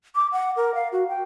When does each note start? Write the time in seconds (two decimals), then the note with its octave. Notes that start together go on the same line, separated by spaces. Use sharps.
0.15 D6
0.32 F#5
0.57 A#4
0.75 F5
0.92 F#4
1.09 G5